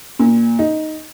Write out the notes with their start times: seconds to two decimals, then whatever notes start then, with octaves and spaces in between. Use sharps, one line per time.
0.19 A#2
0.59 D#4